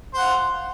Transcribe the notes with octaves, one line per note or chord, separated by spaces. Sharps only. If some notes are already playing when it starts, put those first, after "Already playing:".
F4 C5 F#5